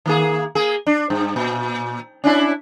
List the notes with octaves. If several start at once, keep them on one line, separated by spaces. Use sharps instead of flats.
D#3 A#3 G#4
A#3 G#4
D4
G2
A#2
C#4 D4 E4